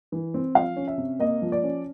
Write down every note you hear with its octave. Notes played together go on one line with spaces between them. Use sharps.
E3
C4
F3 F5
C#4
E5
C3
A#3 D#5
F3
D5
C#4